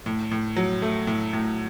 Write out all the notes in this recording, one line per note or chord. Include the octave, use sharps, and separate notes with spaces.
A2
A2
F#3
A3
A2
A2